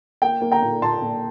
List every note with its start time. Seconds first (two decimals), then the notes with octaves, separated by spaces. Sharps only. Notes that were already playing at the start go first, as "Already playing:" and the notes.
0.22 A#3 G5
0.42 A#3
0.52 G5 A#5
0.62 A#2
0.82 A#2 A5 C6
1.02 A#2